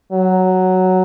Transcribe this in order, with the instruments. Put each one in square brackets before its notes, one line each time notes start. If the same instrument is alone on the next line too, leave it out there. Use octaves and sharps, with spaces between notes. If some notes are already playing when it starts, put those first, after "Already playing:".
[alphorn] F#3